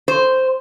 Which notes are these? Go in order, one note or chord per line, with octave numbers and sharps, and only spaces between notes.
C5